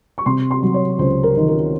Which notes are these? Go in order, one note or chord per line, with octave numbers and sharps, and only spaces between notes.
C#6
C3 C6
C6
F#3
C#5
C#2 C5
A#4
D#3
A#4